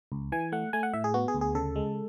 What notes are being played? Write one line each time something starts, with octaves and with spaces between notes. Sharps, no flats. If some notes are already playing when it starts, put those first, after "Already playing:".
C#2
E3 G#5
A3 F#5
A3 G#5
F#5
A2 E5
G#4
B3 F#4
G#4
D2
G#4
C#3 A4
G#3